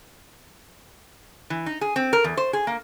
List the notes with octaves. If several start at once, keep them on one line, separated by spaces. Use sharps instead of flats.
E3
D#4
G#4
C4
A#4
E2
C5
G#4
A#3